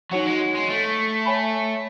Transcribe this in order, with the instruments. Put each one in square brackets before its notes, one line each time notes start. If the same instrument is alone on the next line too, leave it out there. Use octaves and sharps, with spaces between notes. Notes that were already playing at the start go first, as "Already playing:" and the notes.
[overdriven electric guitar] F#3 [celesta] D#4 F#4 C#5 F#5
[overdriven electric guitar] G#3
G#3
A3
[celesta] C#5 G#5 B5